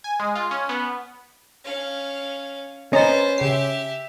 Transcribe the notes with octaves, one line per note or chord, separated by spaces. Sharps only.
G#5
G#3
F4
C#4
B3
C#4 F5
C#4 B4 C5 D#5 A#5 A6
C#3 G4 E5 C7